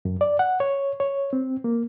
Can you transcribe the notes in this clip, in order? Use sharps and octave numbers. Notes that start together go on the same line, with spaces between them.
F#2
D5
F#5
C#5
C#5
C4
A#3